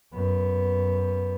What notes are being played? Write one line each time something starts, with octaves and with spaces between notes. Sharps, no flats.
F#2 B3